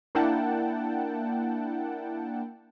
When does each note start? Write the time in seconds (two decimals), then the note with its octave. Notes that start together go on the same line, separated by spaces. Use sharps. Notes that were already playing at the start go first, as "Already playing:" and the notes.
0.15 A#3 D4 E4 F#5 G5 A5